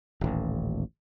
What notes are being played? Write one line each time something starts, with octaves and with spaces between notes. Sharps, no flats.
D#1 A1